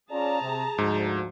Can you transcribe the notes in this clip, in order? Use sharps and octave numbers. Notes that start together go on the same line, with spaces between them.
C#4 F4 G#4 D5 A5 A#5
C3
D2 G#2 F3 F#4